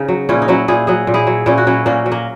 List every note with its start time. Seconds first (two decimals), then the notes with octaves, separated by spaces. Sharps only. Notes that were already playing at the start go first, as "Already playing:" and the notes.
Already playing: C#3 D#4
0.08 F#3
0.29 A#2 C#4 E4
0.42 D#4
0.48 F#3 C#4 E4
0.68 A#2 E4 G#4
0.87 F#3 G#4
1.07 A#2
1.14 E4 G#4
1.27 F#3
1.46 A#2 C#4 E4
1.58 F#4
1.67 F#3 C#4 E4
1.86 A#2 A#3 C#4
2.06 F#3
2.12 A#3